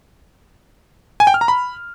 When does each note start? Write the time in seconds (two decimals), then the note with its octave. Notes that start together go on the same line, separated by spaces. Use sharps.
1.20 G#5
1.27 G5
1.34 F6
1.41 A#5
1.48 B5